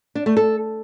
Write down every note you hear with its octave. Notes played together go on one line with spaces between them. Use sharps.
D4
A3
A4